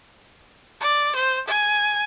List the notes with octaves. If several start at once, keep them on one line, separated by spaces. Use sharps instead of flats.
D5
C5
G#5